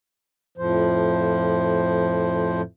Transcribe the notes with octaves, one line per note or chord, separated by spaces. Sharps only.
F2 A2 F3 C5